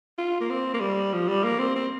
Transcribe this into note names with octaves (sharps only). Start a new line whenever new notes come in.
F4
A#3
C4
A#3
G3
F3
G3
A#3
C4
C4